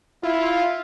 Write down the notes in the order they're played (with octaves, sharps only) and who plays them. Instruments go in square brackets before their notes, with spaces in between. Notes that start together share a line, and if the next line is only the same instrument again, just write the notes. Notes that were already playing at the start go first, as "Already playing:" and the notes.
[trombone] E4 [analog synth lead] F4